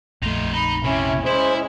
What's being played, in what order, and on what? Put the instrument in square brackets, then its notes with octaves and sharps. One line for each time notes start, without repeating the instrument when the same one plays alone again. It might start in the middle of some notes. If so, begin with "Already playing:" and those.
[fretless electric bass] A#1 F2 A3 [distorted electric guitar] D#4 F4
[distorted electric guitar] D#4 [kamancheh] B5
[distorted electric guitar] C3 [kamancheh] C#4 E4
[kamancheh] G#3 C#4 [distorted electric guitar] E4 [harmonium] C5